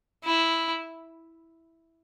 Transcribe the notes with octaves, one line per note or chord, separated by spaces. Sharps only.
E4